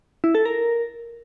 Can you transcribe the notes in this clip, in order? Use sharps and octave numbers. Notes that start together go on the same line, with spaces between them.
E4
A4
A#4